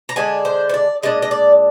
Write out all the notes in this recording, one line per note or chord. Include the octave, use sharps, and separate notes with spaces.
A#5
D3 G#3 D4 G#5
C5
C5
D5
A#2 G#3 D4 D#5
D#5
D5